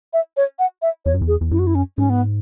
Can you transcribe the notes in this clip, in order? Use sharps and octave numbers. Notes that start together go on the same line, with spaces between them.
E5
C#5
F#5
E5
E2 C#5
F#2
E2
G#4
E2
F#2 E4
F#4
E4
C#4
G#2 C#4
B3